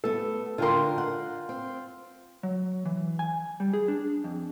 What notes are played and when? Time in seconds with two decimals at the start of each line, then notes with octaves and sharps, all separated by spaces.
0.04 A3 B3 A4
0.58 D3 F4 A#4 G5 C6
0.98 F#5
1.49 C4
2.43 F#3
2.85 E3
3.19 G#5
3.60 G3
3.74 G#4
3.88 D4
4.24 F2